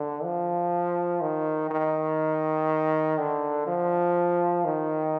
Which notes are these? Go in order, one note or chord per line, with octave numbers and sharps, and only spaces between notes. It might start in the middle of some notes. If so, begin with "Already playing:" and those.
Already playing: D3
F3
D#3
D#3
D3
F3
D#3